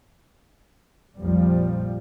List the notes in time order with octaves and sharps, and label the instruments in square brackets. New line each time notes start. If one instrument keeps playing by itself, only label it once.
[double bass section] A#1 F2 A#2 F3 G3